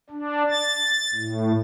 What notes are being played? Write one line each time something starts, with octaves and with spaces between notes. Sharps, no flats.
D4
A6
A2